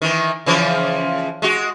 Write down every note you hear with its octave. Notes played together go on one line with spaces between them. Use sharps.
D#3 E3
C#3 E3 F3
G#3 F#4